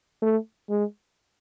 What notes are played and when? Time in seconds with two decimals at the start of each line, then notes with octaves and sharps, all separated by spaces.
0.22 A3
0.69 G#3